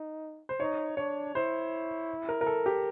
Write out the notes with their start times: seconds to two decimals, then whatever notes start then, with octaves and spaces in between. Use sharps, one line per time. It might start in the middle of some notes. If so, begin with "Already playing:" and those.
Already playing: D#4
0.49 C5
0.60 D#4 C#5
0.97 D4 C#5
1.35 E4 C5
2.29 A#4
2.41 A#4
2.46 A4
2.66 G4